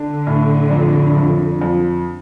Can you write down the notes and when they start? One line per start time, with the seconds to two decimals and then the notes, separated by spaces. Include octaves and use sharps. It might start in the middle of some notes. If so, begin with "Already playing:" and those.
Already playing: D3 D4
0.27 A2
0.71 F2
1.17 F2
1.61 F2